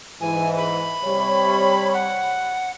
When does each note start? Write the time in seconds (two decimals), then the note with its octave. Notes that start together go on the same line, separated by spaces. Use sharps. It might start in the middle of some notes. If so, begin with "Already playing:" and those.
0.21 G#2 E3 G#5
0.57 B5
1.04 C3 G3 C#5
1.94 F#5